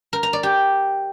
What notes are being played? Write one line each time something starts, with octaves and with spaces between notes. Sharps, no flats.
A#4
A#5
D5
G4